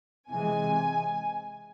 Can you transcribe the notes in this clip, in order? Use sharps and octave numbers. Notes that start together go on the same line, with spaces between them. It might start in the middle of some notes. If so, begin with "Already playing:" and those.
C3 E3 G#3 G#5